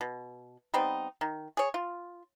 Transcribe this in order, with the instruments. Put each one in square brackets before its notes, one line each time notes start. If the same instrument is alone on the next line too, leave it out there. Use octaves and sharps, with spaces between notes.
[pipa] B2
G3 B3 C4 D#4
D#3
G#4 C#5
F4